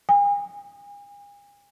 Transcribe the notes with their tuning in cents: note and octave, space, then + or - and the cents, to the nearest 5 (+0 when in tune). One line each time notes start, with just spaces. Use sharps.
G#5 -40